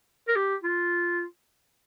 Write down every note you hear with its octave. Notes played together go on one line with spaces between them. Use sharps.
A#4
G4
F4